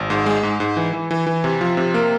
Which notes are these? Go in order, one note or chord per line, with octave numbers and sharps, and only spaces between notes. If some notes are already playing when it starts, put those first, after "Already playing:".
Already playing: G#1
G#2
G#3
G#2
G#2
E3
E3
E3
E3
C3
F3
C3
A#3